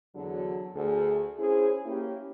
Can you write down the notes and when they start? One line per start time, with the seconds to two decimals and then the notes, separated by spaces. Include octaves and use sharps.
0.15 E2 D3 F#3
0.75 D2 G#4
1.39 C#4 E4 G#4 C5
1.86 A#3 C#4 E4 G4